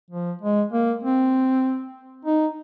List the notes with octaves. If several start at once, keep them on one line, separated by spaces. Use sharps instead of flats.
F3
G#3
A#3
C4
D#4